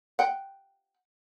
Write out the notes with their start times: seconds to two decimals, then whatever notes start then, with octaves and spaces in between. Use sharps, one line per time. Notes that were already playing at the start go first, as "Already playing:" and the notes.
0.19 F#5 G5